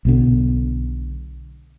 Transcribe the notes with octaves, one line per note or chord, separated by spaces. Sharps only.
B1 B2 D3